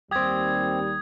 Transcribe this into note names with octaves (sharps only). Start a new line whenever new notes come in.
D#2 G3 C4 G4 D#6 G#6